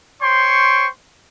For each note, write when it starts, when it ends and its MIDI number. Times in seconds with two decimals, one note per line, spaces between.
0.22 0.87 72
0.22 0.87 73
0.22 0.87 79
0.22 0.87 84
0.22 0.87 85